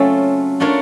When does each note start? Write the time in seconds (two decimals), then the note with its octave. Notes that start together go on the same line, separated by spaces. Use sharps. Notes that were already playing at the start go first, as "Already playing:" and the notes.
Already playing: F#3 A3 C4 C#4 F4 A4
0.60 A3 D4 F4 A#4 C#5